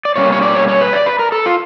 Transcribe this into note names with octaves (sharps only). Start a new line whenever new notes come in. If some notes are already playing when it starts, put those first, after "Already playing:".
D5
B2 G3 A#3 C#4 C#5
C#5
D5
C#5
C#5
B4
D5
B4
A#4
A4
F4